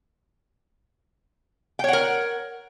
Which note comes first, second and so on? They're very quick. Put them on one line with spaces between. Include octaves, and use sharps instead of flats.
G5 C#5 F#5 A#4